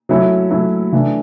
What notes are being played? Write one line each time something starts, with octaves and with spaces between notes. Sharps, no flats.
F#3 A3 C#4 E4
F#3 A3 C#4 E4
E3 A3 D4